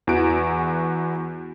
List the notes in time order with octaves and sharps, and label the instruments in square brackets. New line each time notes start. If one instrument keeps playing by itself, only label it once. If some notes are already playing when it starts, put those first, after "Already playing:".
[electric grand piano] E2 E3 F#4 D7